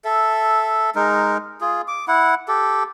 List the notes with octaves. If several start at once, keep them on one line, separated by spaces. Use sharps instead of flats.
A4 E5
G#3 D#4 A#4
F4 G#4
D6
E4 F#5
G4 A4